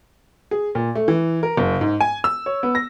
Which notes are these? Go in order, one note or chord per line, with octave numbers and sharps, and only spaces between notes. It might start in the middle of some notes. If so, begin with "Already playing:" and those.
G#4
A#2
A3
E3
A#4
F#1
G#2
G#5
E6
C#5
B3
A#6